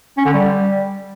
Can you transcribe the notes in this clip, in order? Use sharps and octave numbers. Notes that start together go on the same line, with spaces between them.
C#4
D3
G3